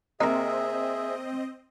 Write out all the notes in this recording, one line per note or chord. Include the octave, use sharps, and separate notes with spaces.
C3 A#3 C4 D#4 G#4 D#5 E5 A#5